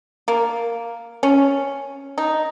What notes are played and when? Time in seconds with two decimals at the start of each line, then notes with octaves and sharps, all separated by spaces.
0.28 A#3
1.23 C#4
2.18 D#4